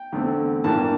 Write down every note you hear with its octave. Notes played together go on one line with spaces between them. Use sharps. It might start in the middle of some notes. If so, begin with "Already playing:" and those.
Already playing: G5
E2 D3 A3 C4
G2 E3 A#3 A5